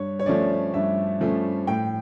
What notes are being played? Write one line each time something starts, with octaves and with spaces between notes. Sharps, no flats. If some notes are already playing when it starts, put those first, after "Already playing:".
Already playing: G2 C#5
C#5
F3 A3 C#4 D5
G2 E5
F3 A3 C#4
A2 G5